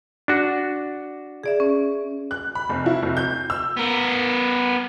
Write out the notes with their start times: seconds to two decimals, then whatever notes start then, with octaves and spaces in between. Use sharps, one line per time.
0.28 D4 F#4
1.43 G#4 D5 E5
1.60 C#4
2.31 F#6
2.55 B5
2.69 F1
2.86 E4
3.02 F1
3.17 G6
3.50 E6
3.77 B3 A#4